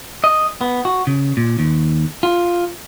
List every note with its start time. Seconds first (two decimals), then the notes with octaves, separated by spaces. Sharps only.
0.24 D#5
0.61 B3
0.85 F#4
1.07 C#3
1.37 A#2
1.59 D#2
2.23 F4